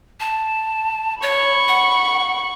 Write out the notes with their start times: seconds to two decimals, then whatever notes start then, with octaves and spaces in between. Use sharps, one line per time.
0.20 A5
1.22 C#5 B5 C#6
1.68 F#5